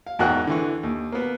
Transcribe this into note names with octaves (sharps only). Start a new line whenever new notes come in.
F5
E2 G#2 F#4 A#4 G5 F#6
D3 E3 C#6
D#2
A#3 B3